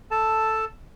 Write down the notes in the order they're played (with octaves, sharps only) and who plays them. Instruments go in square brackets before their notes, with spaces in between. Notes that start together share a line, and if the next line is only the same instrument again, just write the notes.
[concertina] A4 A5